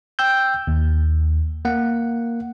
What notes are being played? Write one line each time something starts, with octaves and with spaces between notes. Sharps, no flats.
G5 E6 G6
D#2
A#3 F#5